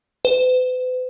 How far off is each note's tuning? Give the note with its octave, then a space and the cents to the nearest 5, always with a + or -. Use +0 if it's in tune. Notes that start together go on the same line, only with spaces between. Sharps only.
B4 +45